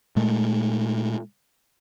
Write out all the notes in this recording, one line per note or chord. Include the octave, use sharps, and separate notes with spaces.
A#2 G#3 A3